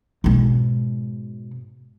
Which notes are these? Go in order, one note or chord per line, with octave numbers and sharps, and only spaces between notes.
G#2 B2